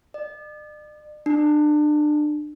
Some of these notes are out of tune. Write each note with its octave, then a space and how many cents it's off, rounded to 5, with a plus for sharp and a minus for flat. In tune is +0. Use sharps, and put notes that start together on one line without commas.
D5 +45
D4 +30